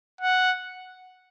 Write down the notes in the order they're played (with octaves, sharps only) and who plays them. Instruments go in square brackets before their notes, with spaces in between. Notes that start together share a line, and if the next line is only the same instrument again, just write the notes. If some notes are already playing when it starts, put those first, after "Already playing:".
[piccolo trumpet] F#5